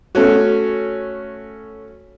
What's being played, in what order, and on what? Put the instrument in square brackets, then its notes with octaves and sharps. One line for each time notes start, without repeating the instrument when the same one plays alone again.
[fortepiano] A3 C#4 F#4